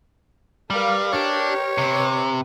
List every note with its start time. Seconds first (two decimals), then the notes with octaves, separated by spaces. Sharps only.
0.70 G3 A#4 B4 F5
1.13 D4 G4 A#4 C#5
1.78 C3 B4